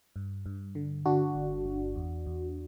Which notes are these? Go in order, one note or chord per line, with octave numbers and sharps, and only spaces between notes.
G2
G2
D3
D3 D4 F#4
G1
G1
E2
E2